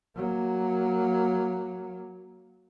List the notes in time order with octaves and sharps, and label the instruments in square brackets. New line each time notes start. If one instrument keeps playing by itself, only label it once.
[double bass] F#3 A#3